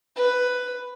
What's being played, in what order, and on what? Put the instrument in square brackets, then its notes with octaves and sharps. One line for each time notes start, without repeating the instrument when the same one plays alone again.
[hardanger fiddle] B4